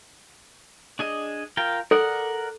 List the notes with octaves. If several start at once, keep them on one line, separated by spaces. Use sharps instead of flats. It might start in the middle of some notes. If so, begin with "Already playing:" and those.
D4 G#4 D#5
F4 A#4 G5
A4 A#4 D5 F#5